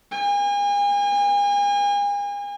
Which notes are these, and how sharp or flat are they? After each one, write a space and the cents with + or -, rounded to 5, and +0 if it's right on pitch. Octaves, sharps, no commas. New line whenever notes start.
G#5 -40